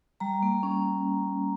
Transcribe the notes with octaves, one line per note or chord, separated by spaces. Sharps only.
G3 A#5
A#3
C#4